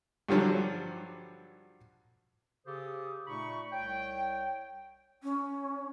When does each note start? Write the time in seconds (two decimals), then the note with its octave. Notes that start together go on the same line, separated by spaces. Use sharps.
0.29 G2 D3 F3 F#3
2.66 C#3 G4 A4 C5 D#6
3.27 A#2 A3 D#4 B5 C#6
3.72 C2 C#5 G5
5.23 C#4